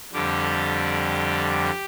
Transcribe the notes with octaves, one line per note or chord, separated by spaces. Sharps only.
F2 D3 G3 G4